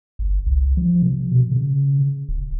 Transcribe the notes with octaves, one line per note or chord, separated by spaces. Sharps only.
G1
C2
F3
C3
B2
C#3
D#1